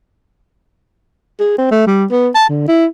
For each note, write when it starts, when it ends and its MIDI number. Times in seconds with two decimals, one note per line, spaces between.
1.40 1.55 68
1.58 1.70 60
1.71 1.84 57
1.87 2.05 55
2.11 2.29 59
2.35 2.48 81
2.49 2.66 50
2.68 2.86 64